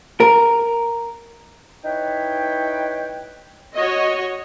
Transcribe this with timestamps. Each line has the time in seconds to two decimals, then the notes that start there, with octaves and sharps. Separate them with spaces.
0.20 A#4
1.85 D#4 E4 B4 C#5 G5
3.74 F#4 C#5 D#5